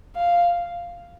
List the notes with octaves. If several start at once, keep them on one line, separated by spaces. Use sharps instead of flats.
F5